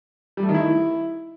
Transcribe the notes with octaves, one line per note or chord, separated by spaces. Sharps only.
G3
A3
D#3
E4